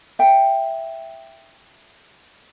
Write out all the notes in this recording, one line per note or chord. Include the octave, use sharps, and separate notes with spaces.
E5 G5